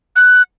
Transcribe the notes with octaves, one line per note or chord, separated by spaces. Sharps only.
F#6